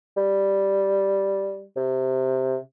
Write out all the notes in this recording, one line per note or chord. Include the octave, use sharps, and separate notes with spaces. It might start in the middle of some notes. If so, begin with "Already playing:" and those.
G3
C3